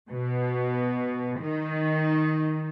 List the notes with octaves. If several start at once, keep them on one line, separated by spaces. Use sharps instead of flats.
B2
D#3